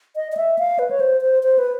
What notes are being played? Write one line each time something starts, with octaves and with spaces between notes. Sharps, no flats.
D#5
D#5
E5
F5
B4
C#5
C5
C5
C5
B4